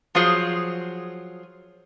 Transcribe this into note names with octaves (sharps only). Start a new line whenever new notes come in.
F3 F#3 F4 G#4 C5